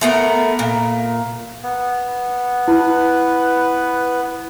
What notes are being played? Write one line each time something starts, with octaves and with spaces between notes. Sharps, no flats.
A3 B3 A#4
A#2
B3
E4 B4